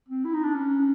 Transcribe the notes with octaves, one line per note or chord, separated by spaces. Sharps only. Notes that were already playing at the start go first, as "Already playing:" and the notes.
C4
E4
D#4
D4
C#4